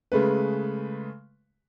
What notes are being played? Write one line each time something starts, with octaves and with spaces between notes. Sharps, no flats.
C#3 G#3 A3 B4